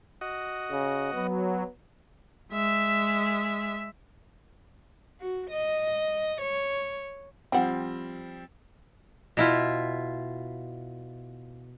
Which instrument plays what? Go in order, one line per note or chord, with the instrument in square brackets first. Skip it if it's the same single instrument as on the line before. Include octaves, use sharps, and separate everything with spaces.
[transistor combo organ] F#4 D#5
[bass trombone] C#3
[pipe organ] F#3 [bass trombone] B3
[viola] G#3 E5
[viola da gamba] F#4
D#5
C#5
[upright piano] F3 G3 C4 [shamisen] F#5 G5
[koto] B2 E4 F4